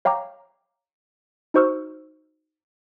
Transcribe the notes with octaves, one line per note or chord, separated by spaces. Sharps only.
C#5 F5 G5 A#5 D6
D#4 F#4 C5 C#6 E6 F6